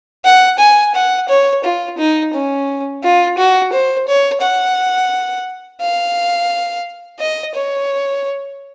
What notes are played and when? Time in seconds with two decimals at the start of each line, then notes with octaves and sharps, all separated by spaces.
0.24 F#5
0.59 G#5
0.95 F#5
1.29 C#5
1.64 F4
1.98 D#4
2.33 C#4
3.03 F4
3.38 F#4
3.73 C5
4.07 C#5
4.41 F#5
5.81 F5
7.19 D#5
7.54 C#5